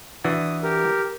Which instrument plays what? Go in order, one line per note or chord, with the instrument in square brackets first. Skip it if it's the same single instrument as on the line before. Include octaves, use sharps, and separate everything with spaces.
[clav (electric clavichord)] E3 D4 F#4 [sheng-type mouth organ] D#6
[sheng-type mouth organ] G4 A#4